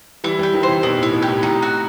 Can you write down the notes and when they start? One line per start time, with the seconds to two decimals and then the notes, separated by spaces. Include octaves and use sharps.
0.24 E3 G3 E4
0.39 E3 G3 G4
0.53 D#3 F#3
0.63 C5
0.68 C3 E3
0.83 B2 D#3 E4
0.98 A2 E4
1.13 B2
1.22 G4
1.28 A2 C3
1.43 A2 C3 D#4
1.62 F#4